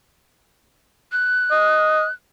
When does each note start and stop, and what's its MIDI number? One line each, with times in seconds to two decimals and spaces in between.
1.12 2.12 90
1.51 2.04 75